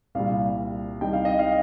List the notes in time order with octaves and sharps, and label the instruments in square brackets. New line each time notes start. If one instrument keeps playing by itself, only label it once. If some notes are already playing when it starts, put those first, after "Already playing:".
[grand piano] C2 A#2 G3 F5
C2 C3 G3 D#4 G5
F5
D#5
F5